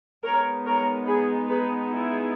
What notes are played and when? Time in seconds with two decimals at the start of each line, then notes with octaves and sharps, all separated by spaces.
0.23 G#3 B3 D#4 A#4 C#5
0.65 A#4 C#5
1.06 G#4 B4
1.48 G#4 B4
1.90 E4 G#4